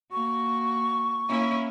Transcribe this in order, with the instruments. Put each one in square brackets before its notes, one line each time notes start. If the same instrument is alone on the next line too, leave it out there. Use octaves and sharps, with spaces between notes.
[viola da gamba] A#3 F#4 [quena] C#6
[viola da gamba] A#3 C#4 E4